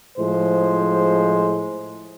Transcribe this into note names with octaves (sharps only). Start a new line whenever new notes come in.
A2 F3 G#3 C5